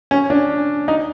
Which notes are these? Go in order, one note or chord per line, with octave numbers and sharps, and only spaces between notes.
C#4
D4
D#4